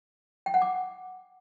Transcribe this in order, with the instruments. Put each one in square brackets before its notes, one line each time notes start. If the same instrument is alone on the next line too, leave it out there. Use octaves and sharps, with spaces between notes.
[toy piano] G5
F#5
D6